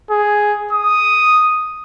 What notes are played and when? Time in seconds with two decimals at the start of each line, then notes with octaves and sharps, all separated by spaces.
0.10 G#4
0.73 D#6